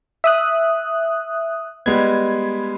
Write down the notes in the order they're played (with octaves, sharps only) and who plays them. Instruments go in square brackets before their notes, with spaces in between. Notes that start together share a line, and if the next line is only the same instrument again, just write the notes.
[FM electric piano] E5 D#6 F#6
[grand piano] G3 G#3 B3 [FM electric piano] G#6